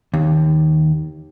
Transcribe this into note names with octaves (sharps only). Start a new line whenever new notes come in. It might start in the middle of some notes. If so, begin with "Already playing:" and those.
D#2